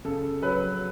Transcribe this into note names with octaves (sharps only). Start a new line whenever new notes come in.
C#3 A4
F#3 B4